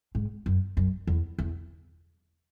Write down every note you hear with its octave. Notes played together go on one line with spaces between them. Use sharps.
G#2
F#2
F#2
E2
E2